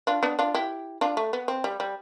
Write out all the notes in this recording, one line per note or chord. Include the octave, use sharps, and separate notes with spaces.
D4 F4
B3 D4
D4 F4
E4 G4
D4 F4
A3
B3
C4
G3
G3